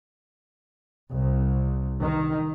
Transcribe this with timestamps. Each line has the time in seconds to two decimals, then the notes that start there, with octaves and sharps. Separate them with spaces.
1.14 C2
2.00 D#3